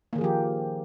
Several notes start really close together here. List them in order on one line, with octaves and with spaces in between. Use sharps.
A#3 D#3 G#4 F3 G4